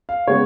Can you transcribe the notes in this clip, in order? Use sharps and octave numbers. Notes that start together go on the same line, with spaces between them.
F5
C#3 G#3 B3 C#5